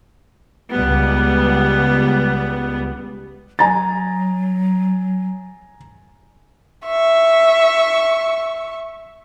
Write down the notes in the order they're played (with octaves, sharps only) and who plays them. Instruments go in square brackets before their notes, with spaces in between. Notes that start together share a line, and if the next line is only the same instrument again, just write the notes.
[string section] C#2 G3 B3
[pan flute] F#3 [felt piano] G#5 A#5 A6
[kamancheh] E5 C#6